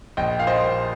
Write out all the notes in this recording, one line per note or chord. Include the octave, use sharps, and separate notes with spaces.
A#1 D#5 G5
A#2 F5
C5 D#5
G3